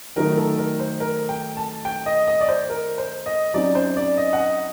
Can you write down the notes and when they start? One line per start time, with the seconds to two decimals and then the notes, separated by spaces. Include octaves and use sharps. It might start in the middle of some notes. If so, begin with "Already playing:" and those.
0.16 D#3 F#3 A3 D#4 A#4
0.37 A4
0.58 A#4
0.80 C5
1.00 A#4
1.29 G5
1.57 A5
1.85 G5
2.06 D#5
2.27 D#5
2.41 D5
2.48 C5
2.70 A#4
2.98 C5
3.26 D#5
3.54 F#2 F#3 C4 D#4 D5
3.75 C5
3.96 D5
4.17 D#5
4.33 F#5
4.38 D#5